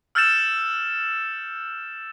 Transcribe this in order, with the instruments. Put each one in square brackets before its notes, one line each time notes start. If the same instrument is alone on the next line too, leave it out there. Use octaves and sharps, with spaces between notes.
[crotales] E6 F6 G6 A6 C#7 E7